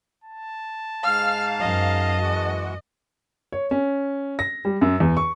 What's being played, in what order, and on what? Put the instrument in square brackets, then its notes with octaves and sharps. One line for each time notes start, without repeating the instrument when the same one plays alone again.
[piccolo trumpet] A5
[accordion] G#2 F5 [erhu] F6
[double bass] F#2 [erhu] D#5
[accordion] E3 G#3 F#4
[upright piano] C#5
C#4
A#6
G3
F#2
E2
C#6